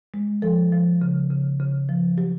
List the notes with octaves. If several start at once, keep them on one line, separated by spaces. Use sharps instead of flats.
G#3
F3 A4
F3
C#3
C#3
C#3
F3
F#3 G4